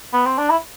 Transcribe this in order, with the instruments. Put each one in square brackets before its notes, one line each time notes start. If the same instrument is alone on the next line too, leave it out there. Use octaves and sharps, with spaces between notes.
[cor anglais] B3
C4
D4
E4